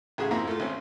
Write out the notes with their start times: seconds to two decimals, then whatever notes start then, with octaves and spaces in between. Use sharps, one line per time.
0.18 A1 C#3 F#4 G#4
0.31 F2 G#2 A#3 C4 E4 A#5
0.47 A3 F4
0.60 G#1 C4 C#4